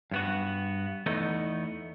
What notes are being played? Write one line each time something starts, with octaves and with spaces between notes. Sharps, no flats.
G2 B3 F#4
E2 A3 B3 D#4